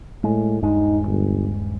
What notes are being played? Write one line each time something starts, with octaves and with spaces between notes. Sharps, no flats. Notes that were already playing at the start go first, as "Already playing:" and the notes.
A2 G#3
D#1 G2 G#3 D#4
G1